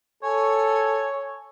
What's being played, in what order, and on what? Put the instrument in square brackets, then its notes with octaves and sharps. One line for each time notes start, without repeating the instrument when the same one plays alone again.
[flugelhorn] A4 [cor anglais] C#5 [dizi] G#5